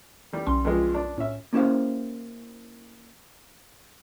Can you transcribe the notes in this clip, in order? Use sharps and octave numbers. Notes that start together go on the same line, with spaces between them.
E3 G3
B1 C#4 C6
G2 F3 G#3
D4
A2 C#4 E5
A#3 C#4 E4 G4 C5 F5